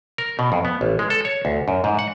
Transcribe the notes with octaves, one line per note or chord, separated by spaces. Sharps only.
A#4
B2
F2
B3
A1
G#3
A4
C#5
D2
F#2
G#2
F#5